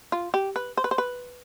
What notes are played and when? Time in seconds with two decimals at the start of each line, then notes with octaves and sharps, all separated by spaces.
0.12 F4
0.34 G4
0.56 B4
0.77 C5
0.84 B4
0.91 C5
0.98 B4